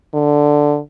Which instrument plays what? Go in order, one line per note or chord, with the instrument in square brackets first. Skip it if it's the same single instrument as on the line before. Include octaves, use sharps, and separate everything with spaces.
[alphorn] D3